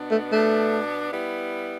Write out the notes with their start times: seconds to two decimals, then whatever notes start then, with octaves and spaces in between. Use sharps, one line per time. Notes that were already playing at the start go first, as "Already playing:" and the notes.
Already playing: B2 B3 D4
0.11 A3
0.31 B2 A3 B3 D4
1.12 G3 B3 E4